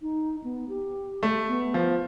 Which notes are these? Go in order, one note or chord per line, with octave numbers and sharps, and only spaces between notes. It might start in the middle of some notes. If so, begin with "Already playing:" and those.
D#4
B3
G4
A3
B3
F3